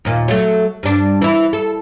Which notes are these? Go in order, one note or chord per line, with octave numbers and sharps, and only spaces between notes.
D#2 A#2
F#3 A3
G2 D4
E3 E4
A4